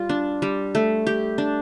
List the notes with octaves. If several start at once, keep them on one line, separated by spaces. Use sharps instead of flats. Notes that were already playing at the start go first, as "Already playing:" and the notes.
Already playing: G3 F4
D4
G3
A3
G4
D4